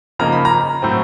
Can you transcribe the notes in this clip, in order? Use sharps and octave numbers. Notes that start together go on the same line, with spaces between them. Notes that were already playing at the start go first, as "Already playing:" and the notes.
C#3 F3 A#3 D#4 A#5
B5
A#5
A2 F#3 A3 C4